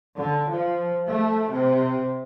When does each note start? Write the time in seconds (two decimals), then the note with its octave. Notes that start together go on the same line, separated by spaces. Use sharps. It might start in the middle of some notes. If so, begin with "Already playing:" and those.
0.17 D3
0.50 F3
1.08 A3
1.51 C3